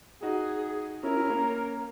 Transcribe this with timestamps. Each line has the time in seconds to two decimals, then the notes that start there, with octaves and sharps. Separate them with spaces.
0.22 D#4 F#4 G#4
1.03 C#4 E4 A#4
1.16 C#4 E4
1.30 A#3 C#4